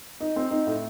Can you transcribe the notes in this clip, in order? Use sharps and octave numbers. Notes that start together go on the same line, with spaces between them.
D#4
C4
D#4
A2